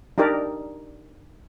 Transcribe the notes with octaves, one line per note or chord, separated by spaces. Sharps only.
D4 D#4 G4 A#4 D5